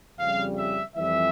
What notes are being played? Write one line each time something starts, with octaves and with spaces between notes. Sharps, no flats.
F2 C#3 G3 F5
E5
F2 E3 G3 E5